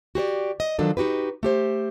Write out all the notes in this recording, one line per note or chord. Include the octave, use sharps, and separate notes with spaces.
F#4 G4 C5 D5
D#5
D#3 F3 F#3 D4 A4
D#4 F#4 G4 B4
A3 G4 C5